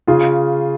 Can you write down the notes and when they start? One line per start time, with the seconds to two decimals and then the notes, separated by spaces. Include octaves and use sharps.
0.07 C#3 F4 G#4